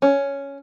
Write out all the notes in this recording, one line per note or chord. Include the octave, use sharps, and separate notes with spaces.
C#4